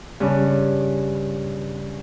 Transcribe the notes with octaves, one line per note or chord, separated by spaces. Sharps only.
G2 C#3 C#4